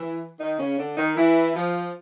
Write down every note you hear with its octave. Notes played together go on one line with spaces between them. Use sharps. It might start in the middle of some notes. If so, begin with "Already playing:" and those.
Already playing: E3 E4
D#3 D#4
C#3 C#4
D3 D4
D#3 D#4
E3 E4
F3 F4